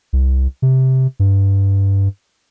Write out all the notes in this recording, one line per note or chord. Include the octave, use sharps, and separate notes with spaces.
C2
C3
G2